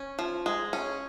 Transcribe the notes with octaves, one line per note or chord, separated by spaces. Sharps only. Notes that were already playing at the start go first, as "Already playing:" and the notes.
Already playing: C#4
F3
G#3
C#4